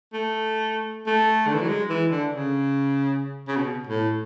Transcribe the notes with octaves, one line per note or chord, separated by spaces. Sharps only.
A3
A3
D3
E3
F#3
G#3
E3
D3
C#3
C#3
B2
A2